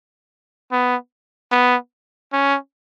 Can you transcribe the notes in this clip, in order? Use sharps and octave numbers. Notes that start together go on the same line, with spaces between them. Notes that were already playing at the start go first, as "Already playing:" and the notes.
B3
B3
C#4